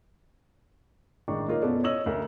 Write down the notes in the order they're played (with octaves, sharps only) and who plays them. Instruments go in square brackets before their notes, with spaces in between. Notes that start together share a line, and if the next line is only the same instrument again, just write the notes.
[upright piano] A1 D#3 G#3 D4 D#4 C#6
A#3 D#4 F4 A#4 C#5
F#2 B2 B3 C#4 A4 D5
C#4 C#5 D#5 E6 F#7
D2 A3 A#4 E5